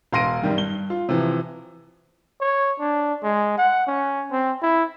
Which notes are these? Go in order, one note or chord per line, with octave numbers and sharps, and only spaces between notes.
E1 F5 C6 A#6 D7 D#7
F#2 D#3 G3
G2 G7
F4
C3 E3 F3
C#5
D4
G#3
F#5
C#4
C4
E4